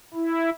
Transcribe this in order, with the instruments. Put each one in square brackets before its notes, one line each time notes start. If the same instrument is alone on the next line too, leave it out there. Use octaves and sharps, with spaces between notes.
[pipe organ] E4